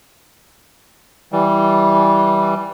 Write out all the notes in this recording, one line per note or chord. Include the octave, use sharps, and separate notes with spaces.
E3 G3